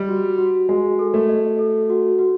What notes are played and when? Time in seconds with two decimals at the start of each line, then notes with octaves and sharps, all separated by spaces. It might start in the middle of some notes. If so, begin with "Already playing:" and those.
Already playing: G3 D#5
0.09 F#4
0.38 F#4
0.69 G#3 F#4
0.99 A4
1.14 A3
1.29 D#5
1.59 A4
1.90 F#4
2.19 F#4